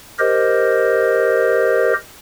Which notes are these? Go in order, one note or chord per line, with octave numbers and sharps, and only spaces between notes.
G4 A#4 C5 D#5